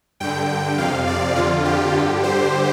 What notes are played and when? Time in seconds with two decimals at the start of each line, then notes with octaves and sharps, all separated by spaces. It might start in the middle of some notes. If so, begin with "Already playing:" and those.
0.20 G2 D3 G5
0.78 F2 C3 F5
1.07 D5
1.36 F2 D3 F4
1.65 G4
1.94 G2 D3
2.23 C5